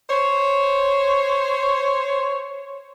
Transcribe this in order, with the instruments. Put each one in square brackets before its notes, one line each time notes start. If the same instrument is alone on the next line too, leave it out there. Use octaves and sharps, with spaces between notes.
[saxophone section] C5 C#5